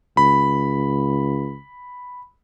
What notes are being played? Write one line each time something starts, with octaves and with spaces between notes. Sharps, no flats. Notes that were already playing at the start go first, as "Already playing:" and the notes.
C#2 B5